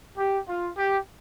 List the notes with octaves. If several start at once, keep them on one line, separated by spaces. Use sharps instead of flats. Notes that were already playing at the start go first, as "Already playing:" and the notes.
G4
F4
G4